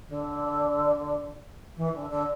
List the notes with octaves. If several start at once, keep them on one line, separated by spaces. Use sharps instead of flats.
D3
E3
D3
D3